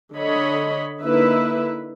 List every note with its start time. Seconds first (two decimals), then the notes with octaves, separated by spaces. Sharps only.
0.15 D3 C#5 D#5 B5
1.03 D3 A#3 D#4 E4 B4 E5